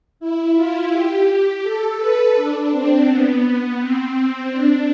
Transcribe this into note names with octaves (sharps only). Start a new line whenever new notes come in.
E4
F4
G4
G4
A4
B4
D4
C4
B3
C4
D4